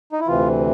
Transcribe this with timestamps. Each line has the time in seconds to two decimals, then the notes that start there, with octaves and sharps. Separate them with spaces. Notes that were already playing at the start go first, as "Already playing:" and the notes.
0.13 D#4
0.20 E4
0.27 D2 C3 E3 F4